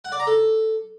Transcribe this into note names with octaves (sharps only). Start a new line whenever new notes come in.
F#5
D5
A#5
A4